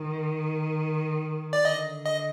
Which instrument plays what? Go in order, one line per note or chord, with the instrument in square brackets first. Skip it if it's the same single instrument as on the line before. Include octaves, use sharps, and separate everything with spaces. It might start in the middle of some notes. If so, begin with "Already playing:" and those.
Already playing: [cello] D#3
[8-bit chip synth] D5
[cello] D3 [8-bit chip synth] D#5
[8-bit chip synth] D#5